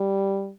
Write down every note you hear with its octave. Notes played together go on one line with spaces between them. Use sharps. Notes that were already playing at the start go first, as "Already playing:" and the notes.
Already playing: G3